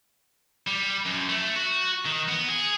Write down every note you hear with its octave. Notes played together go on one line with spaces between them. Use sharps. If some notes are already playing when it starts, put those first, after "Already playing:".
G3
F#2
A3
F#4
D#3
B3
G#4